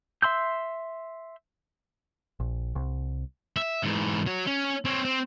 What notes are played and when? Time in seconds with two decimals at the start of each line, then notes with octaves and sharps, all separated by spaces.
0.22 E5 C6 E6 G6
2.40 A#1
2.75 C2
3.57 E5
3.83 G#2 E3
4.26 F#3
4.47 C#4
4.85 C4 C#5
5.05 C4